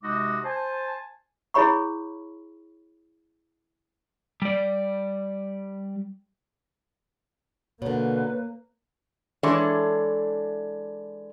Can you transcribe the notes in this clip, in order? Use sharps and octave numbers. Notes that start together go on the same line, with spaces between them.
C3 G#3 D#4 F#4 D#5 D6
C5 G#5 A5
E4 G#4 C#5 B5 C#6
G3 D5
B2 D3 A#3 B4 C#5
E3 G#3 D4 A4 C#5